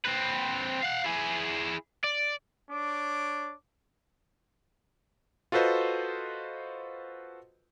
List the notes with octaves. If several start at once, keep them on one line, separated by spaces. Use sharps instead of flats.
C4 B4
F5 F#5
E4 G#4
D5
D4 C#5 D6
F4 F#4 A4 B4 C5 D#5